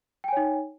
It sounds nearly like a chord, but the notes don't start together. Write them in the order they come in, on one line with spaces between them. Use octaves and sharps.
G5 G#5 C#5 D#4